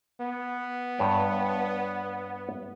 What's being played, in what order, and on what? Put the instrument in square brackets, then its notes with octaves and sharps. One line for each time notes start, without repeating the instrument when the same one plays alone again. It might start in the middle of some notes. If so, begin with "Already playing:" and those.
[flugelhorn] B3
[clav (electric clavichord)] G2 C#5 G5